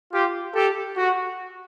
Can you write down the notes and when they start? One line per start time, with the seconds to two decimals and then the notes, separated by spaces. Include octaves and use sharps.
0.13 F4 G4
0.54 G4 A4
0.96 F#4